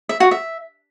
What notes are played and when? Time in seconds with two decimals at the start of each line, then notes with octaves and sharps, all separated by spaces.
0.09 E5
0.20 F#4
0.31 E5